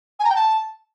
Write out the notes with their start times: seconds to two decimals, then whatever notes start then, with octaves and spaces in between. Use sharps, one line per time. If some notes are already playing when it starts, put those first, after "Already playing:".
0.19 G#5
0.25 A#5
0.30 G5
0.35 A5